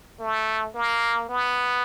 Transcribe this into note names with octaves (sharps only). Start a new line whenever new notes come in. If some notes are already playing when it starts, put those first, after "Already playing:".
A3
A#3
B3